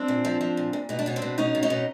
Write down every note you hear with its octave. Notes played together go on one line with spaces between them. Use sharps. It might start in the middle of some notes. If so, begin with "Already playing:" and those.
Already playing: C4 D4
A#2
F3
F3
A#2
A#2
B2 D#4
D4
B2 C#4
C4 D4
B2
B2 C#4 D#4
B2
C#4 D#4
B2